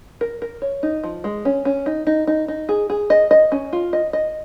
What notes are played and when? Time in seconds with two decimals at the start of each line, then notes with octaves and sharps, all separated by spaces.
0.21 A#4
0.42 A#4
0.62 C#5
0.83 D#4
1.04 F3
1.24 G#3
1.45 C#4
1.65 C#4
1.86 D#4
2.07 D#4
2.27 D#4
2.48 D#4
2.69 G#4
2.90 G#4
3.10 D#5
3.31 D#5
3.52 C#4
3.73 F4
3.93 D#5
4.13 D#5